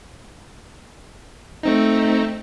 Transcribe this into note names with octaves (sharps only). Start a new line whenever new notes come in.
A3 C4 D#4